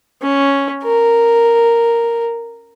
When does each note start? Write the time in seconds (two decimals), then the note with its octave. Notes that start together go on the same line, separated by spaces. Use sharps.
0.22 C#4
0.83 A#4